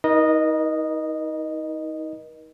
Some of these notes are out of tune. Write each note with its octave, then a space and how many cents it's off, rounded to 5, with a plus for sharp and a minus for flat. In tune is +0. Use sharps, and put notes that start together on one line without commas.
D#4 +35 A#4 +40 D#5 -10